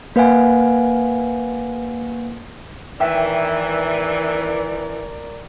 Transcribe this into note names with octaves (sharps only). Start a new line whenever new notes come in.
A#3 B4 F5 F#5 G#5
D#3 E3 A#4 D5 E5 G5